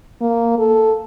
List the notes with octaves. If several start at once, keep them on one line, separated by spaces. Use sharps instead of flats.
A#3
A4